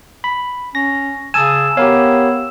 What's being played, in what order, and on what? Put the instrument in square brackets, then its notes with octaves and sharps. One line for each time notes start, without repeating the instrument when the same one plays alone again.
[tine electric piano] B5
[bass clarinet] C#4 [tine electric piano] A#6
[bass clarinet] C#3 [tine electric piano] G#5 A5 D#6 [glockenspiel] E6 E7
[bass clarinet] B3 [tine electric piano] G4 A#4 F5 [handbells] C#5